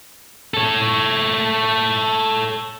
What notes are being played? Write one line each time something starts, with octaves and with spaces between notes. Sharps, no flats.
A4 C#5